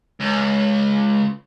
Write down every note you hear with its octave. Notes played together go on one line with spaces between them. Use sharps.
C#2